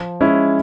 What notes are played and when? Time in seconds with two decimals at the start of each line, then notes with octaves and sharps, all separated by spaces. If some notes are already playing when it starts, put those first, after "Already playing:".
Already playing: F3
0.21 G#3 C#4 E4